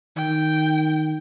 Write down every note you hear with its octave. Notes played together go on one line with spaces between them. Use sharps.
D#3 G5